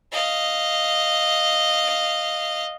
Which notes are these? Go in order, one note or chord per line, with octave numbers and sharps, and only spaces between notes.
D#5 F5